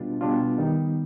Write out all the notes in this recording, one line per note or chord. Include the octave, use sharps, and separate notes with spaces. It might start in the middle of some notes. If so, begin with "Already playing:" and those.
Already playing: B2 G3 D4 F4
B2 G3 D4 F4
D#3 G3 B3 D#4